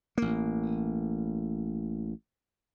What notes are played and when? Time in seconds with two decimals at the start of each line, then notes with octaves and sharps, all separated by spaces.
0.18 A1 A#3